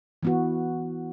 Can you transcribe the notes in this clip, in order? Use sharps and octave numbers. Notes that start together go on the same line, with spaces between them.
E3 B3 F#4